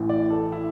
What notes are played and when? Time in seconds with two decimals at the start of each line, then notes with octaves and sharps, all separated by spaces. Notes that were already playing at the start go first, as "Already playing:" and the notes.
Already playing: A1 A2 E3
0.09 D5
0.30 A4
0.52 E4